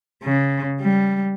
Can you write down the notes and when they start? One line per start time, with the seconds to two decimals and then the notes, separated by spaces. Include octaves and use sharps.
0.24 C#3
0.81 G3